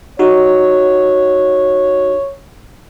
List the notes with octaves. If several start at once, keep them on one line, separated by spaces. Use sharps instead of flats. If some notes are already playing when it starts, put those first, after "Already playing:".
D#4 F#4 G4 C#5